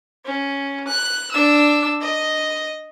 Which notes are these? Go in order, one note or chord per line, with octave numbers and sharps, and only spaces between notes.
C#4
F#6
D4 E6
D#5